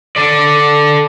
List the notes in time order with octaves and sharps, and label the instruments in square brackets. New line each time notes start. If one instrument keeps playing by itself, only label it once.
[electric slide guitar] A4 D5